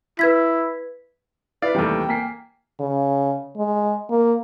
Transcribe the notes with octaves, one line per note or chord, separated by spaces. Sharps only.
E4 B4 G#6 B6
E4 B4 D5 F5
D#2 C3 E3 G3 A3 G5
A#3 G#5 B6 C7
C#3
G#3
A#3